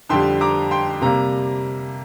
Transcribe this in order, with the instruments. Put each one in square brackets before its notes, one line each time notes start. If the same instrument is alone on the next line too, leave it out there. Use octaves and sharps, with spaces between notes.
[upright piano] F2 D3 G3 G5 C6
A#5 D6
G5 C6
C3 G3 A#3 A#5